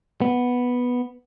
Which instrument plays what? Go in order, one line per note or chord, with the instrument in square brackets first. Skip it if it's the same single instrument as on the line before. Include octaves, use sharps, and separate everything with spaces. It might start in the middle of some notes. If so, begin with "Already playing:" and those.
[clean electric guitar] B3